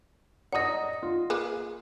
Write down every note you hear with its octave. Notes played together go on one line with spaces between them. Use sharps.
D5 D#5 F#5 A#5 D#6
F4
A#3 G#4 B4